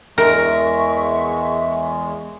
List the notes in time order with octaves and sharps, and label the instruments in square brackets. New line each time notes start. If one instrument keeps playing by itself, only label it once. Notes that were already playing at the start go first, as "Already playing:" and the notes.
[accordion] E2 G#3 [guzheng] A#4 [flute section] E5 C#6